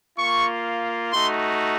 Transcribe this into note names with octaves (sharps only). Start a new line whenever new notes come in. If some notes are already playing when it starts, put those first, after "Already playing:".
A#3 F4 C#6
A3 D#4 F#4 C6